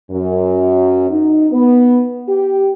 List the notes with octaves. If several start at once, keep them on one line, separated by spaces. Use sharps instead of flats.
F#2
D#4
B3
G4